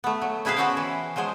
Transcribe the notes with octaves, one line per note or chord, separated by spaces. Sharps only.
A3 B3
F#3
B2 E4 G#4 B4 C5 F5
B3 C#4 F#4 E5 F#5 G5
E3
F3 F#3 G#3 C5